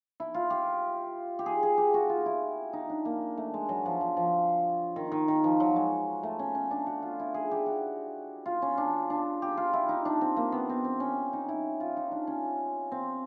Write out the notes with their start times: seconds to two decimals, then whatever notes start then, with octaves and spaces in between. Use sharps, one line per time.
0.20 E4
0.34 F4
0.50 G4
1.39 G4
1.46 G#4
1.63 G#4
1.78 G4
1.94 F#4
2.09 F4
2.26 E4
2.73 D#4
2.90 D4
3.05 A#3
3.37 A3
3.54 G#3
3.69 F#3
3.86 F3
4.01 F3
4.17 F3
4.96 D#3
5.12 D#3
5.28 D#3
5.44 F3
5.60 F#3
5.76 G#3
6.23 A3
6.39 C#4
6.55 C#4
6.71 D4
6.87 F#4
7.02 F4
7.20 E4
7.34 G#4
7.51 G4
7.66 F#4
8.46 F4
8.62 C#4
8.78 D4
9.10 D4
9.42 G4
9.57 F4
9.73 E4
9.89 D#4
10.05 D4
10.21 C4
10.37 A#3
10.52 B3
10.69 C4
10.85 C4
11.00 C#4
11.33 D#4
11.49 E4
11.80 F4
11.97 D#4
12.11 D4
12.27 C#4
12.92 C4